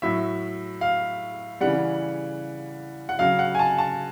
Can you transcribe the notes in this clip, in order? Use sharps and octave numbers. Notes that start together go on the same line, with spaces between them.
A2 F#3 E5
F5
C#3 E3 G3 F#5
F#5
C#3 F#3 F5
F#5
G#5
A5
A5